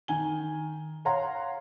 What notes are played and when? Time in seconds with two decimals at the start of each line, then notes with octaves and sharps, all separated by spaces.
0.08 D#3 G#5 G7
1.05 C#5 F5 F#5 A#5 C6